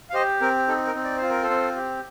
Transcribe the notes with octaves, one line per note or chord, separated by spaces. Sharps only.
F5
G4 C5 D#5
C4 A#4
D#4 A4
A#4
C4
D5
C5
F4
A#4
A4 C5
C4
G4